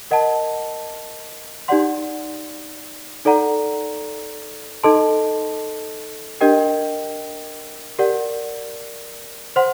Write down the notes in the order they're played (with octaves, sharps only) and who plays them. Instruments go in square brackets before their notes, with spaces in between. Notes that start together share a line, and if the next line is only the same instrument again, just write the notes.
[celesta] A#4 D#5 F#5 A5
D#4 G4 D5 F#5 C6
D#4 A4 D5 F#5 A#5
D#4 A4 D#5 A5 C6
D4 G4 A#4 D#5 G5
G4 A#4 D5 F#5
C5 F#5 C6